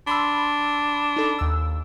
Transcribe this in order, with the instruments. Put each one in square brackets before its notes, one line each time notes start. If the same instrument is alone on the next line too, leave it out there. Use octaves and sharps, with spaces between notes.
[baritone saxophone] D4 [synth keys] B5 C6 E6
[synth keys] D#4 A4 B5
D#2 E6